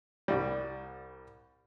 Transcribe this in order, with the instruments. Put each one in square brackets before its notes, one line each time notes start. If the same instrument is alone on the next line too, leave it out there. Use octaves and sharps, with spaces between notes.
[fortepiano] C2 G3